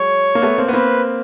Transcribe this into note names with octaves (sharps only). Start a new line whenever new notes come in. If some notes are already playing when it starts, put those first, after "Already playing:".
Already playing: F#3 G#3 C#5
A#3
A3 B3
A#3 C4
B3
A#3 C4 B4